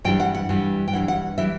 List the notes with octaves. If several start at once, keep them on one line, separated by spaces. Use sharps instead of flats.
G2 E3 G3 G5
F#5
F#5
G2 E3 G3
G5
G2 E3 G3 F#5
F#5
E3 G3 E5